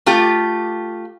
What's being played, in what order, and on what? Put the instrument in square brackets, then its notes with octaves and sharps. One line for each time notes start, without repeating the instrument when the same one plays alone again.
[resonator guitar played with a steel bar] A3 F4 G4